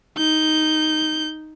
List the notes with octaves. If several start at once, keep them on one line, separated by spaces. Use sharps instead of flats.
D#4 G6